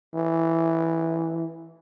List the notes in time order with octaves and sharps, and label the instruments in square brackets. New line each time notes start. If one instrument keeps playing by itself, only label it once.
[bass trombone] E3